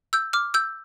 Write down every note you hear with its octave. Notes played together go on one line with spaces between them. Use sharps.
E6 G6
D6 F6
E6 G6